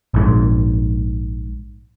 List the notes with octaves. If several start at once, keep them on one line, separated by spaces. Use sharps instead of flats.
A#1 G#2